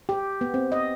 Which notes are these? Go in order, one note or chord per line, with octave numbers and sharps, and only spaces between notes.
G4
B3
C4
D#5